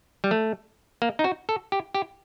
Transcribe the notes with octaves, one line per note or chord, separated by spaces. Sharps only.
G3
A3
A#3
D#4
F#4
A4
G4
G4